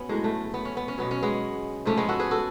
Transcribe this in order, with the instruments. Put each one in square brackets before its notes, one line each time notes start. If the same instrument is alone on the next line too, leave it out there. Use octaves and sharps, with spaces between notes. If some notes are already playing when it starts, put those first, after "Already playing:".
Already playing: [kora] B3 C#4 F#4
A2 F#3 G#3
A3
B3
C#4
B3
C#4
B2 F#3 B3
C#4
G#3 B3
G#2 F3 A3 C#4
G#3 B3
F#4 A4
G#4 B4
F#4 A4